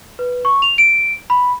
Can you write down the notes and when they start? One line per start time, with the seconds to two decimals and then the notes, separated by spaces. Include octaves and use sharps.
0.19 B4
0.45 C#6
0.62 F7
0.78 D7
1.30 B5